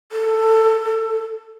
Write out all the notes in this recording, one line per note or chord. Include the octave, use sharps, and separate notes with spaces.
A4